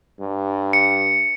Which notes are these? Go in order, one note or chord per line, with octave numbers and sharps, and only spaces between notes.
G2
C#7